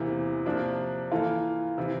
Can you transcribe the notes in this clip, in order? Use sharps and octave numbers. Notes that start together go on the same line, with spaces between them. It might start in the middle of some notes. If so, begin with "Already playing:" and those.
Already playing: E2 C3 E3 A#3
C3 F3 A#3 D4
E3 A#3 F4 A4
C3 E3